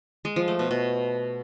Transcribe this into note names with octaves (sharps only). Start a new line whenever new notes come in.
G#3
F3
A3
B2
B2